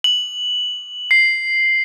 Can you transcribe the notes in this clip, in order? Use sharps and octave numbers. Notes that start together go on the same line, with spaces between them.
F#7
C7